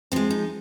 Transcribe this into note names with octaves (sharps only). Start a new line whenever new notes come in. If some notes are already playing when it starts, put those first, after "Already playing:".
F3 G#3 C4
D#4